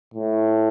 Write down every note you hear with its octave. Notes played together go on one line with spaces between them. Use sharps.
A2